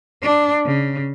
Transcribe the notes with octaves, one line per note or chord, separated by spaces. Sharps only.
D4
C#3